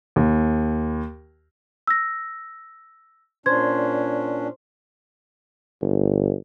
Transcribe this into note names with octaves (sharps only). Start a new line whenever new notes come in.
D#2
E6 A#6
A#2 C#4 D4 C5 G#6
G1